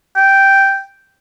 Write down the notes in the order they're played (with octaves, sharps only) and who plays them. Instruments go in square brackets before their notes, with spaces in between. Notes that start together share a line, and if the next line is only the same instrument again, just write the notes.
[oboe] G5